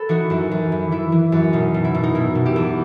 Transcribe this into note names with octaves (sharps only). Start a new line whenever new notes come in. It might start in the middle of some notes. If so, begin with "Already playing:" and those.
Already playing: A4 B4
E3 D#4 F#4
F#2 E4
F#2
E3
E3 E4
E3
F#2
B2 D#4
B2
E4
B2
D#4
B2 E4
B2
E4 G4
E2